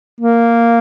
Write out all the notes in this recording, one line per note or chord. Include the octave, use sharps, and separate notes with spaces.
A#3